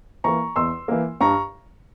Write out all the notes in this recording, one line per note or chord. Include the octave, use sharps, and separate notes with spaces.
E3 A#3 A#5 C#6
E2 C6 E6
E3 A#3
G2 A#5 C#6